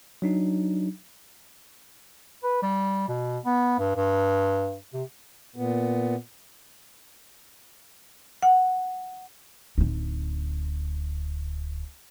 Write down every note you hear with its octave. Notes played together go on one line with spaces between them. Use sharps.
F#3 D4 D#4
B4
G3
B2
B3
G2
G2
C3
A#2 B3
F#5
D1 D#4